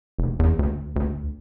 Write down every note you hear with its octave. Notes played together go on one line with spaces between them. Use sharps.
F1
E2
D2
D2